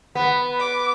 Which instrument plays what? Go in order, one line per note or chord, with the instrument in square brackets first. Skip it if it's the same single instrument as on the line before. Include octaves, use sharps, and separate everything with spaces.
[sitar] B3 [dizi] B5
[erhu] D6